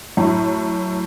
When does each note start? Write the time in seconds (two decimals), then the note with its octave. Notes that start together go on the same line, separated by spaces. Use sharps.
0.17 F#2 A2